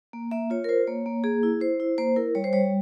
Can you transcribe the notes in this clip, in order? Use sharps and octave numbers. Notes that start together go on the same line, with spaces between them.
A#3
A#3 E5
F4 C#5
A#4
F4 C5
A#3 C#5
A#3
A#3 G#4
E4
E4 C5
E4
A#3 C5
E4 A#4
G3 C#5
C5
G3 C#5